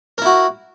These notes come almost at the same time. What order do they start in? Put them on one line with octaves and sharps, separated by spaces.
A#4 E4 F#4